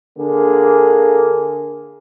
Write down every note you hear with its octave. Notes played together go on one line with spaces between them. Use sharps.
D3 A#3 G#4